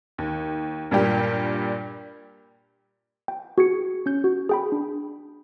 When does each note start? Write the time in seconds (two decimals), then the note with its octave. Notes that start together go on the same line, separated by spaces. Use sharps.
0.18 D#2
0.91 G2 A#2 G3 G4
3.28 G5
3.58 F#4 G#4 G#6 C#7
4.06 C#4 G6
4.24 F#4
4.49 G#4 G5 B5
4.72 D4